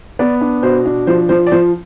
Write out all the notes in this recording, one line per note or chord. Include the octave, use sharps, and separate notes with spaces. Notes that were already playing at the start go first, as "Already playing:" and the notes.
B3 D5
D4
B2 C5
D4
F3 C5
F3 C5
D5
F3 C5